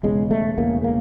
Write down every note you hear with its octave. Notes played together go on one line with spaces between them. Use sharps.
E1 E2 C#3 G#3
A3
E1 E2 C#3 A#3
A#3